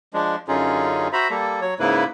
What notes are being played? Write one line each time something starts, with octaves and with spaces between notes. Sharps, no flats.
F3 G#3 D4
F#2 D3 C#4 D#4 F4 G#4
F#4 C5 E5 A#5 B5
G3 A#3 A4
F#3 C#5
G#2 C#3 A#3 E4 B4